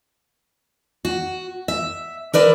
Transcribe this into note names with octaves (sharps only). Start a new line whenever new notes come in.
F#4
E5
A#4 B4 D5 E5